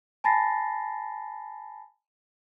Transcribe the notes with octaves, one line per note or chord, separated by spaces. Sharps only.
G#5 A5 B5 A6 A#6 C7